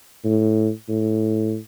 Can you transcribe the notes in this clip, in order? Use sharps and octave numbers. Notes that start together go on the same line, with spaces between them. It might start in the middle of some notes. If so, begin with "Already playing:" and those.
A2
A2